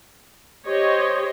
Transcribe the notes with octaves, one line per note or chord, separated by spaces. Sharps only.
G4 C5 C#5 D#5